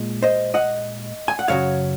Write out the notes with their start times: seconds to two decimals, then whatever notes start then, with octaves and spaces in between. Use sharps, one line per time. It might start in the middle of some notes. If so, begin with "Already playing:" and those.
Already playing: A#2 G#3
0.23 C5 D#5
0.54 D#5 F#5
1.28 G#5
1.39 F#5
1.48 F#2 C#3 F#3 C#5 F5